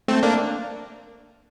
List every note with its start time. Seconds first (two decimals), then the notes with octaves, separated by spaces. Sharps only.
0.08 A3 C4
0.23 A#3 D4